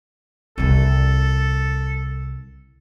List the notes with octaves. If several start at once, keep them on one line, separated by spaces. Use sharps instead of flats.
C2 F4 A4